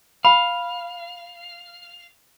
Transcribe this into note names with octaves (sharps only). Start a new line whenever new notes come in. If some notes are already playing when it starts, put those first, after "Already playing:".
F5 B5